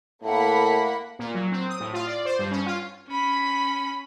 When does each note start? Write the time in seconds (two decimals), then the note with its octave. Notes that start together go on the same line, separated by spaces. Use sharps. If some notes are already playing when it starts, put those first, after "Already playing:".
0.23 A2 A#3 F#5 B5
1.19 A#2
1.34 F#3
1.52 C4
1.69 D#6
1.80 A2
1.93 F4
2.07 D5
2.25 C5
2.39 G2
2.51 C#4
2.66 F4
3.08 C#4 B5